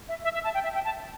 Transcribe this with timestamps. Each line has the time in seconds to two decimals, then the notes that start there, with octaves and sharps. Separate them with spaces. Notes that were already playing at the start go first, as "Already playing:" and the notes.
0.09 E5
0.24 E5
0.34 E5
0.44 A5
0.54 G5
0.64 E5
0.74 G5
0.85 A5